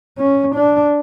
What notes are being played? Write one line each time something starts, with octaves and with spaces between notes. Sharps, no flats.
C#4
D4